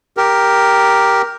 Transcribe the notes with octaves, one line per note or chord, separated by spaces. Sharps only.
G4 A#4